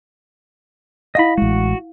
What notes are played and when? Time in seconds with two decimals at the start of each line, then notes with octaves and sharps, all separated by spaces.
1.15 E4 D#5 F5 F#5 B5
1.38 A1 G#3 F#4